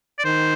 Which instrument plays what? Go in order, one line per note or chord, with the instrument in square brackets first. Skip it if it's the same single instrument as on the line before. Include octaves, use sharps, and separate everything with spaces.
[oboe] D5
[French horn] D#3 [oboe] C5